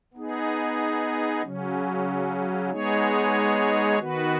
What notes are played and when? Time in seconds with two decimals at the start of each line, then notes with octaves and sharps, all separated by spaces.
0.14 B3 D#4 G#4
1.42 C#3 F#3 C#4
2.70 G#3 B3 D#4 G#4 C#5
3.99 D#3 B3 F#4 B4